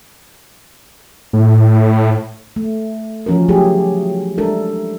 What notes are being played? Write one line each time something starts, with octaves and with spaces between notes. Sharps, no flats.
A2
A3
E3 F3 C#4 F#4 A#4
F#3 A3 C#4 E4 G4 G#4
G#3 D4 E4 A4 A#4